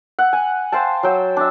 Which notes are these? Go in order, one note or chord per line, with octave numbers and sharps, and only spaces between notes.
F#5
G#5
C5 F5 G5 A5
F#3 G5
D4 E5